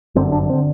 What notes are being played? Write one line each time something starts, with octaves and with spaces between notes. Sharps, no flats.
G1 F#2 D3 C4
D4
D3 C4